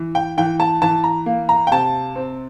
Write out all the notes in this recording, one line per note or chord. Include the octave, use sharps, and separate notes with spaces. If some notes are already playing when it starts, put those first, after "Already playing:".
Already playing: E3
G5
E3 G5
A5
E3 A5
A#5
A#3
A#5
G5
C3 A5
C4